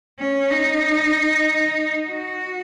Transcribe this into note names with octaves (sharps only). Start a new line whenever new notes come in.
C#4
D#4
F#4